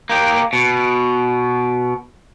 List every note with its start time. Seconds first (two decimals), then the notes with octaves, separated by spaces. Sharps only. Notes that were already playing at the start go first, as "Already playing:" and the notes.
0.10 A#3 G4
0.53 B2